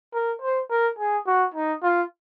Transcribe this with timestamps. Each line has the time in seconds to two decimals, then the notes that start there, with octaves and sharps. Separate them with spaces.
0.13 A#4
0.42 C5
0.70 A#4
0.99 G#4
1.27 F#4
1.54 D#4
1.83 F4